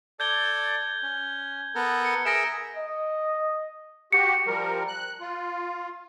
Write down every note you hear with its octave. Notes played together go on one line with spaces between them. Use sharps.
A4 D5 G6 G#6 G7
C#4
B3 A4 A#4
C#7
G#4 A#4 E5 A#6 D7 E7
D#5
F#4 G4 C#7
F3 G3 A#4
F#6
F4